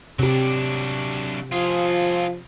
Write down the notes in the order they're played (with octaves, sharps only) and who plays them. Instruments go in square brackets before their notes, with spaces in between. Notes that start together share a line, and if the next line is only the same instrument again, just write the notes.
[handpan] C3 G4 [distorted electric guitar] F#3 D4
[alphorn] F3 [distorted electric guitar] F4 G#4